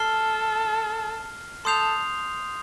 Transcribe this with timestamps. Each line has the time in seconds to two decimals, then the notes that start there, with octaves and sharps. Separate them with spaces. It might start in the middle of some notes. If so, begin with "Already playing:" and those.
Already playing: A4 F6 C7 G7
1.65 A4 C6 D#6 G6 C7 F7